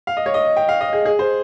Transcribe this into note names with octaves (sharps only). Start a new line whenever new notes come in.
F5
D#5
C#5
D#5
G5
F5
D#5
G#4
G#4
C5